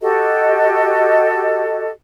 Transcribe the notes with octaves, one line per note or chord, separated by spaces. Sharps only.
F#4 G4 A4 D#5